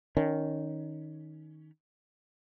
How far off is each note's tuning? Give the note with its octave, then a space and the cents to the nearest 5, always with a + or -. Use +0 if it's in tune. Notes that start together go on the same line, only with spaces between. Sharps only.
D#3 +0 C#4 +15